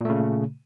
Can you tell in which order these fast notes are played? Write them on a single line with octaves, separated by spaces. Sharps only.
A#2 A3 C#3